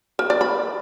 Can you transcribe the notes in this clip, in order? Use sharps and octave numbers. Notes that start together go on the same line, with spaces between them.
A#4
D5
B5